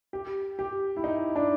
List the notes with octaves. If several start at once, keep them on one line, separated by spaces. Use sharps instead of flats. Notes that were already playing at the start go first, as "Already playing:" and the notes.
G4
G4
E4
D#4
D4